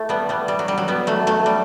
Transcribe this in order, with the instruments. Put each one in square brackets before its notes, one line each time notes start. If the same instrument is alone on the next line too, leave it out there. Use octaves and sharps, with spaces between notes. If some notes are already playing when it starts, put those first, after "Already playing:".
Already playing: [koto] A3 E4
G3 B3
G3 B3
G3
F#3
G3
F#3
G3 B3
F#3 A3
F#3 A3
G3